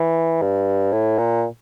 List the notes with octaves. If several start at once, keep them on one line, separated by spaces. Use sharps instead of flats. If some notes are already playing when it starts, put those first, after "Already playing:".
Already playing: E3
G2
A2
A#2